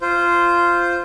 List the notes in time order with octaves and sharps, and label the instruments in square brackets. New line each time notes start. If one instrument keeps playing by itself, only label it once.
[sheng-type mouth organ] F4 C5